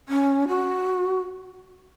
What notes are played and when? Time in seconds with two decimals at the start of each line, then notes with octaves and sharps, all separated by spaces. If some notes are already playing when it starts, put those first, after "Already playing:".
0.09 C#4
0.48 F#4